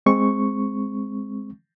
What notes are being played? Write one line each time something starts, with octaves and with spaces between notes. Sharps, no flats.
G#3 C4 C#6